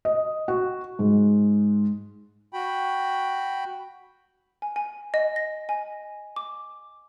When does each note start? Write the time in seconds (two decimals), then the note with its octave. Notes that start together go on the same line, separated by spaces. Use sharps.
0.05 D#5
0.48 F#4
0.99 G#2
2.52 F#4 G5 B5
4.62 G#5
4.76 G#5
5.14 D#5
5.36 A#6
5.69 G#5
6.36 D6